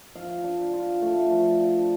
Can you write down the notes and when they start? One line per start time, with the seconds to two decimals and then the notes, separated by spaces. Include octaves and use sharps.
0.15 F3 F5
0.44 D4
0.73 F4
1.02 A3
1.31 F3
1.61 D4